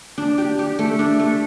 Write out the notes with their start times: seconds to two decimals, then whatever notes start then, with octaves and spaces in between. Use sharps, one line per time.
0.18 D4
0.38 G4
0.59 G4
0.79 A3
0.99 D4
1.20 A3